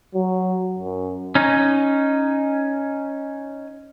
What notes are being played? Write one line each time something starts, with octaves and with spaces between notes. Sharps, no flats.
F#3
F#2
C#4 D#4